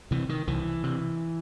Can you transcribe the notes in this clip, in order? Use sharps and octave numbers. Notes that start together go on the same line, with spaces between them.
C3 E3
D#3
C2 E3
C3